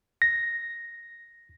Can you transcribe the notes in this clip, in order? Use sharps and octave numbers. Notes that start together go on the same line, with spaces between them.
A#6